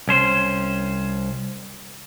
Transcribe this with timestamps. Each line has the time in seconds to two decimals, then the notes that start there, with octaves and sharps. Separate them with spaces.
0.08 C2 C#4 C5